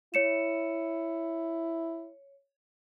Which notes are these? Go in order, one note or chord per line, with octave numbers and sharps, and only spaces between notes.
E4 C#5 C#7 E7